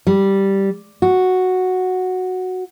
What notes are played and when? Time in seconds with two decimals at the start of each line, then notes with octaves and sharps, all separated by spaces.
0.07 G3
1.02 F#4